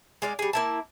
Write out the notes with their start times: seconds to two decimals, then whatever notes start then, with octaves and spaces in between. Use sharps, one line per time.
0.22 G#3 D5 F5
0.39 G3 G#4
0.53 A#3 E4 A5